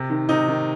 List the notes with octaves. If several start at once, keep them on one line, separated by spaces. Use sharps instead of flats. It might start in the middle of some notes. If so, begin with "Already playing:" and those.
Already playing: C3
D#3
C3 D#4
D#3